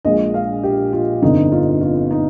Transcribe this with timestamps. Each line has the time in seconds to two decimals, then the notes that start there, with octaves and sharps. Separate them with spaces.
0.05 A#1 A#2 G#3 D#5
0.34 F5
0.63 G4
0.93 F4
1.22 G1 F2 D3 D#4
1.52 F4
1.81 F4
2.11 D#4